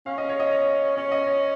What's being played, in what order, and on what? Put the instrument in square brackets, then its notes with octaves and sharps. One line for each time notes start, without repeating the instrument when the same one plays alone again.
[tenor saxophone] C#4 [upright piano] F5
[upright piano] D#5
C#5
D#5
C#5
[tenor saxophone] C#4 [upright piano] C#5
[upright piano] D#5
C#5